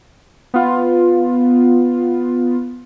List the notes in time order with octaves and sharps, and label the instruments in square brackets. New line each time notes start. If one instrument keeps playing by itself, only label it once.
[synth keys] B3 F4